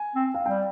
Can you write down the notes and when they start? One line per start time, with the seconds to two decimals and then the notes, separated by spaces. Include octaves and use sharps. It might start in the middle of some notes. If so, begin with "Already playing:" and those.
Already playing: G#5
0.15 C4
0.34 F5
0.46 G3 G5